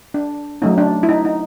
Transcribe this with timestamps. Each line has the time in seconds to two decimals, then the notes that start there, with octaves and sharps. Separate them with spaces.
0.14 D4
0.62 F#3 A3 C#4 D#4
0.78 D4
1.03 E4
1.09 D#4
1.25 D#4